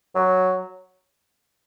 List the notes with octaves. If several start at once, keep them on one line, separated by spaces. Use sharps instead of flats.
F#3